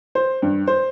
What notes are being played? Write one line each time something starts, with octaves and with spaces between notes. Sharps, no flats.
C5
G2
C5